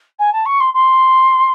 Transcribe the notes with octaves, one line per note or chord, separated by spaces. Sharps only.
G#5
A5
C#6
C6
C6